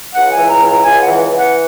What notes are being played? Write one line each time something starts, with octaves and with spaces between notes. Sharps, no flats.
C#2 F#5
G#5
E3
A#5
C#2
A#5
C#2 G#5
F#5
E3
E3
F#5